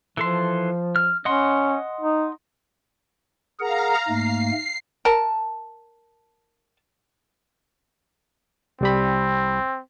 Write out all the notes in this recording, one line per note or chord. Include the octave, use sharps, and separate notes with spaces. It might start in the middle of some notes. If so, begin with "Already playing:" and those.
E3 F3 A4 C6
F6
C#4 D#5 F#5 C6
D#4
G#4 A#4 F5 F#5 A#5
G#2 A3 A#3 C7
A#4 A5
C2 G3 C4 B5